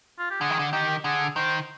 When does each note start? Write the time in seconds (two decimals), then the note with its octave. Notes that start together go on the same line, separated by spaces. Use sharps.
0.19 F4
0.31 G4
0.41 D3 G#4
0.50 D#3
0.59 D3
0.73 D#3 G4
1.04 D3 G#4
1.36 D#3 C5